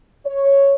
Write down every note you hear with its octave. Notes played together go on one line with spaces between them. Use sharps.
C#5